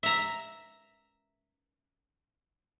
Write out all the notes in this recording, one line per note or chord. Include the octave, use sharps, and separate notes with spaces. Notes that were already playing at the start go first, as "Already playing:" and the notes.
E5 A#5